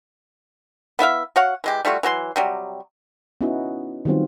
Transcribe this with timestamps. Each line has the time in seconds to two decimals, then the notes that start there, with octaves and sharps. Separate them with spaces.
0.99 B3 E4 E5 F5
1.36 F#4 C#5 F5 F#5
1.64 E3 G#3 G4
1.85 G3 A3 F4 F#4
2.03 E3 F#3 F#4 C6
2.36 C3 F#3 G3
3.41 B3 C#4 D#4 E4 F#4
4.05 D#3 F#3 G3 B3 C4 F4